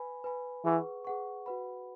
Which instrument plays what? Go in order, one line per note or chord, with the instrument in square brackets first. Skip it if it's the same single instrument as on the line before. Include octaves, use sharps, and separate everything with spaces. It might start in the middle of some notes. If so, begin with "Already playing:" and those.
Already playing: [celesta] B4 G#5 B5
B4 G#5 B5
[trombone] E3 [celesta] G#4 B4 F#5 C#6
[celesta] G#4 B4 F#5 C#6
F#4 B4 F#5 B5